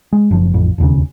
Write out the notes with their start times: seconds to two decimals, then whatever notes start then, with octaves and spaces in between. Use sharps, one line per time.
0.13 G#3
0.31 F#1 F3
0.54 A1 F2
0.78 E1 D#2 C#3